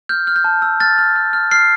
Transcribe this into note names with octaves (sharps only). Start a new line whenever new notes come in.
F6 G6
F6
G6
A5
E6
F6 A6
F6
F6
F6
F6 C7